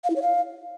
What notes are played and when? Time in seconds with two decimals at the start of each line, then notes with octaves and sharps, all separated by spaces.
0.04 F5
0.10 E4
0.16 C#5
0.22 F5